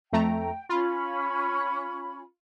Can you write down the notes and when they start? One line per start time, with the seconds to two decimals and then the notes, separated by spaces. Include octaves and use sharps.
0.13 F2 A3 G5 A#5
0.69 C#4 F4 B5